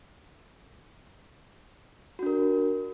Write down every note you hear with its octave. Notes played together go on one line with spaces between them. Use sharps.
D4 F#4 A#4